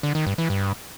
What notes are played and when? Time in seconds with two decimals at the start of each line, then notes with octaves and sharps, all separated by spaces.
0.03 D3
0.15 D#3
0.27 G2
0.38 E3
0.50 G2